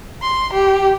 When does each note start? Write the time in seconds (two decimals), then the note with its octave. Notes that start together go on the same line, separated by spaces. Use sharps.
0.22 C6
0.53 G4